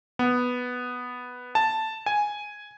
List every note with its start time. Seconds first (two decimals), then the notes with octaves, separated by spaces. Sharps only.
0.19 B3
1.55 A5
2.06 G#5